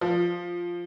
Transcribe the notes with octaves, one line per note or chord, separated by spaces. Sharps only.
F3